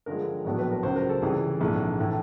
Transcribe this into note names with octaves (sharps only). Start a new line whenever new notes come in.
G2 D3 F3 G#3 A#4
A#1 A2 F#3 B3 D4
B4
A#4
C#2 C#3 F#3 C5
A#4
A4
C#2 C3 E3 G3 G#4
A#1 G#2 E3 A3
A2 E3